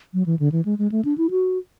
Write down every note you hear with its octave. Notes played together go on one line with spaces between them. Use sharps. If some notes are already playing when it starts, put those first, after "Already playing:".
F#3
E3
D3
E3
G#3
G#3
A3
D4
E4
F#4